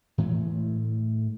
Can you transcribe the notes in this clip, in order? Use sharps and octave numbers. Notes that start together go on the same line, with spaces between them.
A2 E3 G#3 A3